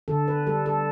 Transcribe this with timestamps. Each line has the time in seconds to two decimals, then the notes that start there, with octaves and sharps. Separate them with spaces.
0.08 D3 A4
0.28 B4
0.47 G3 A4
0.66 A4